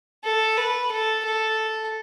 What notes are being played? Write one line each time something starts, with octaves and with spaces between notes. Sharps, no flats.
A4
B4
A4
A4